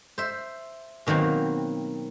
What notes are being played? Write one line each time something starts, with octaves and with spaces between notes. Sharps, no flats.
C5 E5
B2 D#3 F#3 A#3 C4